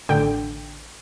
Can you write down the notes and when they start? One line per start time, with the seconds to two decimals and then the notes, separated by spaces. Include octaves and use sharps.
0.09 A1 D3 G5